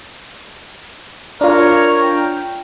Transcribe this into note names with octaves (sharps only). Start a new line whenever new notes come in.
D4 F4 A#4 C#5
G5